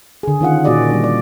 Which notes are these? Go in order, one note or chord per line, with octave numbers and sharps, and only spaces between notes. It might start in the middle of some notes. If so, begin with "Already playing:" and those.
D3 G#4
D#3 C#4 F4 F#5
A#2 A#3 F#4 G#4 D5 D#5
G3 D4
D5